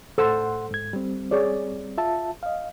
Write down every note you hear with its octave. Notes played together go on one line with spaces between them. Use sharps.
A2 A4 C5 F#5 C6 E6
G#2 G#6
G3 C4
G#4 C#5 D5
F4 E5 A5
D#5 F5